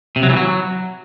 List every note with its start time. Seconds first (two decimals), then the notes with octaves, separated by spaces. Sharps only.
0.16 C3
0.23 F#3
0.30 E3
0.37 F#3